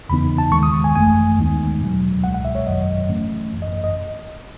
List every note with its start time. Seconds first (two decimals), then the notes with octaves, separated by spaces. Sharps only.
0.09 E2 C#3 E3 B3 D#4 B5
0.38 A5
0.52 D#2 D#3 G#3 C#6
0.63 D#6
0.84 G#5
0.95 G#1 F#2 E3 A3 G#5
1.38 D#2 D#3 G#3 B3 D#4
1.81 E2 B2 F#3
2.23 C#2 B2 G#3 F#5
2.34 F#5
2.45 E5
2.55 C#5
2.66 G#1 F#2 D#3 F#3 D#5
3.08 G#2 E3 A3 C#4
3.52 G#1 F#2 E3
3.62 D#5
3.73 D#5
3.84 D#5